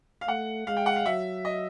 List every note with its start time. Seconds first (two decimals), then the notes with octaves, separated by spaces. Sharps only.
0.21 F5
0.28 A3 F#5
0.67 G#3 F5
0.77 G5
0.86 F#5
0.96 F5
1.06 F#3 E5
1.45 D#5